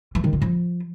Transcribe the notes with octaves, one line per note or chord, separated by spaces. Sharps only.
E3
D#3
F4
F3